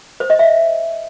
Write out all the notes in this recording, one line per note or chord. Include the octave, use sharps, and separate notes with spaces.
C5
D#5
E5